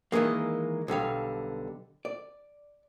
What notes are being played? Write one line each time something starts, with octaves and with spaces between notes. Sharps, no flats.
D#3 E3 F#3 G#3 A#3
B1 D3 G3 F5
D5